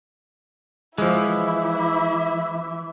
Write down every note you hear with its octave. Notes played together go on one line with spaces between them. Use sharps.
E3 F3 G#3 E4 E5